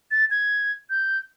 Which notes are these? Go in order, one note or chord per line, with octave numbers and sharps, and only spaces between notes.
A6
G#6
G6